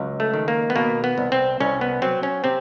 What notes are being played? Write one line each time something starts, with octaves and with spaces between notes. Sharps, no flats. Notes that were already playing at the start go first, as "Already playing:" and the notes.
Already playing: C#2 F#3
A3
D#3
A#3
B3
B2 A#3
B3
C2
C4
C2 C#4
B3
F#3 C4
C#4
C3 C4